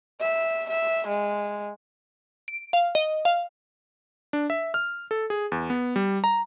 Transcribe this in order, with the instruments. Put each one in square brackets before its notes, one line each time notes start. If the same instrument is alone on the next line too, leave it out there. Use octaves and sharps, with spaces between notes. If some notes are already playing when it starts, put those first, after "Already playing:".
[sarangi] E5
E5
G#3
[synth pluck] D7
F5
D#5
F5
[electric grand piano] D4
E5
F6
A4
G#4
E2
B3
G3
A#5